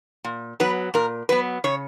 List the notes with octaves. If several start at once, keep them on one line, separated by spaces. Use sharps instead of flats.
A#2
F#3 B3 B4
A#2 A#4
F#3 B3 B4
C#3 C#5